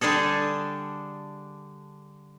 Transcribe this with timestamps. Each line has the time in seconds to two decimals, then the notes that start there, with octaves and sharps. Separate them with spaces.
0.01 D3 G3 D4 G#4 A4